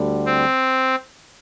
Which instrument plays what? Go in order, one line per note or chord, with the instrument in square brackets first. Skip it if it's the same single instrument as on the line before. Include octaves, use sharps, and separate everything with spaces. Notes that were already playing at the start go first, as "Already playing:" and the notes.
Already playing: [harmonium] D2 D3 G3
[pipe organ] C4